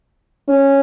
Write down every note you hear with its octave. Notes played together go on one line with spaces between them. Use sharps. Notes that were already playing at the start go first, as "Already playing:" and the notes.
C#4